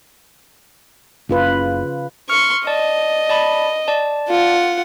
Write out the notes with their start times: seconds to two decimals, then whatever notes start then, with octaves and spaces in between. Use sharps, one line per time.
1.29 F#1 C#3 F4 B4
2.30 C6 C#6 F6
2.67 D5 D#5 A5
3.29 D5 A5 B5
3.88 D5 A5
4.30 F4 F#5